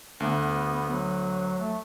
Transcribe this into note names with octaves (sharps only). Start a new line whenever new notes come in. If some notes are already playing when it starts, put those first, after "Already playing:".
D2 B3
F#3
A3